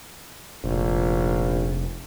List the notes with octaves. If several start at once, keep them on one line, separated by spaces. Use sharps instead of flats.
F1 A#1